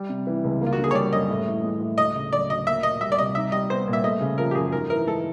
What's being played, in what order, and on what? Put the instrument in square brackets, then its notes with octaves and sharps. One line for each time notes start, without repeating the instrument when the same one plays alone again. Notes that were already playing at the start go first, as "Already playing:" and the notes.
Already playing: [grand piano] G3
C3
E3
C#2
A#3
[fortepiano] F4
[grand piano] D3 [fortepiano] F#4
[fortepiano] G#4
C#5
[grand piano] G3 [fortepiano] D5
[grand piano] F#2 [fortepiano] D#5
[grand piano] A2
E3
G#3
A2
[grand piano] D2 [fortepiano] D#5
[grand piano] C#3
[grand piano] F#3 [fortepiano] D5
[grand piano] D2 [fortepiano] D#5
[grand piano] A#3 [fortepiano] E5
[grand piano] A#2 [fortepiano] D#5
[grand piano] G3 [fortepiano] E5
[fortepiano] D5
[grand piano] C2 [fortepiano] D#5
[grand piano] D#4 [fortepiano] E5
[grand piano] G3 [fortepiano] D#5
[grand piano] B3 [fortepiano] C5
[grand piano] A#2
[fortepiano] E5
[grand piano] A3 [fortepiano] D#5
[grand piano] C#3
[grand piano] F3 [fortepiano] A#4
[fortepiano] G4
[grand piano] F#2 [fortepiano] G#4
[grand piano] G#2 [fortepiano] A#4
[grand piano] E3 [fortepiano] A#4
[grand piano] G#3 [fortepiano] A4